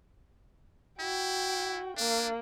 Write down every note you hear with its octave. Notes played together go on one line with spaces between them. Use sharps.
E4 F#4 G5
A#3 D4